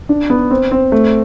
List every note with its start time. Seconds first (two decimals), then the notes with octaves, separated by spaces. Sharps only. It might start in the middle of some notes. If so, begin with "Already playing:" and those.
0.09 D4
0.30 B3
0.51 C4
0.71 C4
0.92 A3